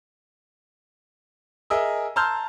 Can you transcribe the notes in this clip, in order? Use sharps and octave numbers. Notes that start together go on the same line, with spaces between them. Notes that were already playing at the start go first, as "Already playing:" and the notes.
G#4 A#4 D#5 E5 E6
A5 A#5 C6 E6 F6 G6